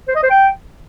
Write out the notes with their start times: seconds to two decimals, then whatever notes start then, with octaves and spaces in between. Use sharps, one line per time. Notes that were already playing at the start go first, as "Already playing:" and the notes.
0.08 C5
0.15 D#5
0.23 C5
0.30 G5